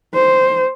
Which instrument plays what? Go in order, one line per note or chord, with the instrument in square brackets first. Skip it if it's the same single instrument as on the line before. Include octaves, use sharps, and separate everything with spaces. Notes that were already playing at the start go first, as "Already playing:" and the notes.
[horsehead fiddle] C5